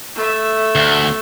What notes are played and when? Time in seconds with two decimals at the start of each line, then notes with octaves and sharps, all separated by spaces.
0.15 A3 E5
0.75 D2